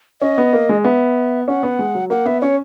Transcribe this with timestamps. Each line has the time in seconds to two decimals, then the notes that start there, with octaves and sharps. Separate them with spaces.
0.21 C#4 D#5
0.38 B3
0.53 A#3
0.69 G#3
0.84 B3 E5
1.48 C#4 F#5
1.63 B3
1.79 G#3
1.95 F#3
2.10 A#3 F#5
2.26 B3 E5
2.41 C#4 C#5